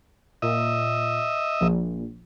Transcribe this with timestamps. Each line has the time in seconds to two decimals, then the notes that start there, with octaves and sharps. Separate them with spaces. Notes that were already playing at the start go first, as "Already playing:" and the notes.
0.42 A#2 D#5 E5
1.61 A#1